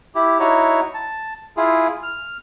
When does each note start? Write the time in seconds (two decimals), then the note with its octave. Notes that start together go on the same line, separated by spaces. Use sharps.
0.15 E4 G4
0.40 D#4 E4 F#4 C#5
0.94 A5
1.57 E4 F4 G#4
2.03 F6